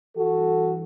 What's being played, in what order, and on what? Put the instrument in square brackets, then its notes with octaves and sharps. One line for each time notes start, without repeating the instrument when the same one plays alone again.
[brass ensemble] G2 E3 F#4 A4